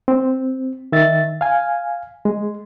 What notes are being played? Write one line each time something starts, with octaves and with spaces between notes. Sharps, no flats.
C4
D#3 E5 A6
F5 G#5
G#3